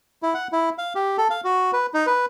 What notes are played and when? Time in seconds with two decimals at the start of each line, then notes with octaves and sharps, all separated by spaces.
0.23 E4
0.34 F#5
0.52 E4
0.78 F5
0.95 G4
1.18 A4
1.30 F5
1.44 F#4
1.73 B4
1.94 D#4
2.07 B4